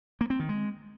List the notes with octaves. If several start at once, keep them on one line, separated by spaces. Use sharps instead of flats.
A#3
C4
D#3
G#3